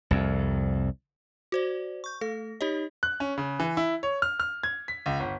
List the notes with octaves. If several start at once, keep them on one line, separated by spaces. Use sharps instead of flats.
C2 F2
F#4 C5 D5
C#6 G6
A3 A4 A#6
D#4 G4 C#5 D#5
F#6
C#4
C#3
E3
E4
C#5
F6
F6
G#6
B6
C#2
G1